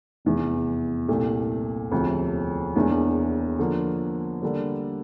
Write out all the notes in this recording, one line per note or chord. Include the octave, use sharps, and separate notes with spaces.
F1 E2 E3
C2 A#2 A3
E1 D2 C3 F3
E1 E2 E3 A#3 D4
D3 F3 A#3
D3 G3 A#3